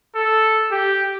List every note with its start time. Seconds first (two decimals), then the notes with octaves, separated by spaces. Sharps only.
0.16 A4
0.72 G4